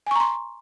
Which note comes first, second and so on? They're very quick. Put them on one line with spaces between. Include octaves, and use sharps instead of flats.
G#5 C#6 A#5 C6